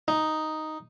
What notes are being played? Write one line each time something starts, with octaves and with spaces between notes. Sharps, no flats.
D#4